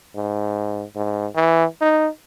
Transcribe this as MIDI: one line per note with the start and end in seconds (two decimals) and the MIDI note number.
0.15 0.83 44
0.96 1.27 44
1.35 1.65 52
1.81 2.08 63